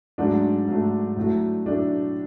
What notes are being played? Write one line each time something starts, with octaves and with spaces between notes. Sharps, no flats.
G#2 F#3 A3 D4
G#2 F#3 A3
A2 F#3 A3
A2 F#3 A3 D4